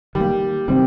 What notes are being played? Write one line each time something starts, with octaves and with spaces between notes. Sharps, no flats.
D#3 G3
A#3
C3 D#3 G3 C4